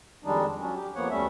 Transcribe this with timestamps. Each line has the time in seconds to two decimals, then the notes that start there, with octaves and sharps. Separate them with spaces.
0.24 F2 D#3 G3 G#3 D4 D#4
0.59 F#3 C#4 D4
0.74 G4
0.95 F2 F3 A#3 B3 C#5 F#5
1.10 D2 G3 A3 C#4 E5